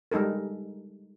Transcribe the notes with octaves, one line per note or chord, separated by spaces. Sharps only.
G3 G#3 D#4 A4 A#4